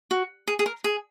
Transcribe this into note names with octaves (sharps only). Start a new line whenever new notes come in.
F#4
G#4
G#4
A#4
G#4